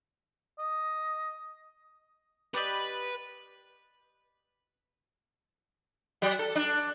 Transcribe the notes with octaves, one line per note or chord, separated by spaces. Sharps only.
D#5
G4 B4 D5 D#5
F#3
A4
D4